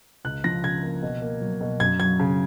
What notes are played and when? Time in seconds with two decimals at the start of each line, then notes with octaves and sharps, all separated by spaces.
0.25 C#2 F#6
0.44 F3 A#6
0.63 C#3 G#6
0.83 A#3
1.02 B2
1.22 A#3
1.41 F#3
1.61 B2
1.80 F#2 G#6
2.00 F#3 G#6
2.20 C#3